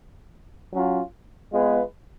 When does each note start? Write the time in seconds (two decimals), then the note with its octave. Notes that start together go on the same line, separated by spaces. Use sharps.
0.72 F#3 C#4 F4
1.53 G#3 B3 F4 G#4 B4